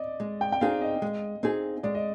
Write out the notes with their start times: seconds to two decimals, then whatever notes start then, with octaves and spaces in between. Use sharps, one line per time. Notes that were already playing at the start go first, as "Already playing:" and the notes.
Already playing: D5 D#5
0.20 G#3
0.41 G5
0.52 G5
0.61 C4 D#4 G#4 F5
0.81 D#5
1.02 G#3
1.43 C4 D#4 G#4
1.83 G#3 D5
1.95 D#5